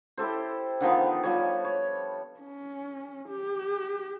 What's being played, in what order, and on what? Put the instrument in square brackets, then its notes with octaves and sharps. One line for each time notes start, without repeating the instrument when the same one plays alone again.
[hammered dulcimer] E4 G4 A4 C5
D3 D#3 F3 B3
F3 G3 C#5
C#5
[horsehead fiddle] C#4
G4